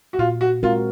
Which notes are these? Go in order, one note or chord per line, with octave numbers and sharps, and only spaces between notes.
F#4
A#2 F4
F#4
G#3 C4 F4 F#4 A#4